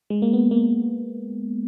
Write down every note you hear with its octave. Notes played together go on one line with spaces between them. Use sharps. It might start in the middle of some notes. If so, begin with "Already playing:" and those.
G#3
A#3
B3
A#3